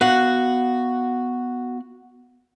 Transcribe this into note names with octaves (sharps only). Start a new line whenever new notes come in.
B3 F#4 F5 F#5